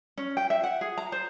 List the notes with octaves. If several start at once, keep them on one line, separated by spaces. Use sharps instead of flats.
C#4
G5
E5
F#5
G#4
A#5
C5